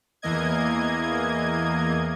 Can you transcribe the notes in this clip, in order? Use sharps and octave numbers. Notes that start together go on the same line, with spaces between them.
E2 E3 A#3 D#5 G#6